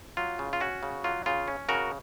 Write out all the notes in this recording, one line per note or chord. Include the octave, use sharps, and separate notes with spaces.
F#3 F4
C#3
F4
C#4 F#4
C#3
F#3 F4
C#3 F4
C#4
C#3 F#4 A#4